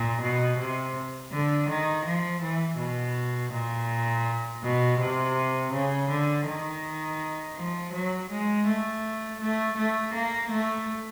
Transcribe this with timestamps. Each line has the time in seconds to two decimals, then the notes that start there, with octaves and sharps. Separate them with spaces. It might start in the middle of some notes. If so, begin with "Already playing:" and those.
Already playing: A#2
0.22 B2
0.58 C3
1.32 D3
1.69 D#3
2.06 F3
2.42 E3
2.78 B2
3.52 A#2
4.63 B2
5.00 C3
5.73 C#3
6.10 D3
6.46 D#3
7.56 F3
7.93 F#3
8.30 G#3
8.66 A3
9.41 A3
9.77 A3
10.14 A#3
10.51 A3